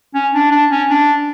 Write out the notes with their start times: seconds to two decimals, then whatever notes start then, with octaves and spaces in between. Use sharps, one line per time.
0.15 C#4
0.34 D4
0.52 D4
0.71 C#4
0.90 D4